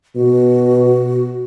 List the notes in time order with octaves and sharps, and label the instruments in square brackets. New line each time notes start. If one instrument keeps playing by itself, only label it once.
[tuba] B2 [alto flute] F#4